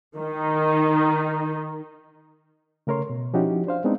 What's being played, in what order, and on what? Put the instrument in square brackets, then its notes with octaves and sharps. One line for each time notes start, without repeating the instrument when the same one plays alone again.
[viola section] D#3 D#4
[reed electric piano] C#3 A3 A#4 C#5 C6
B2
F3 C#4 D#4 E4 F#4 G4
D4 C5 F5
G#3 B3 C4 D4 D#4